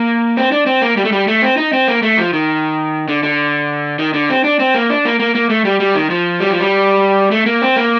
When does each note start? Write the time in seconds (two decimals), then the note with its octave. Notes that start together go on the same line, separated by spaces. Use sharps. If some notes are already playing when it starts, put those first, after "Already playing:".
Already playing: A#3
0.37 C4
0.52 D4
0.66 C4
0.82 A#3
0.97 G3
1.05 A3
1.12 G3
1.28 A3
1.42 C4
1.57 D#4
1.73 C4
1.88 A#3
2.02 A3
2.18 F3
2.33 D#3
3.08 D3
3.23 D3
3.99 D#3
4.14 D3
4.29 C4
4.44 D4
4.60 C4
4.75 A#3
4.90 D4
5.05 A#3
5.20 A#3
5.35 A#3
5.50 A3
5.65 G3
5.80 G3
5.95 D#3
6.10 F3
6.40 G3
6.50 F3
6.60 G3
7.31 A3
7.46 A#3
7.62 C4
7.76 A#3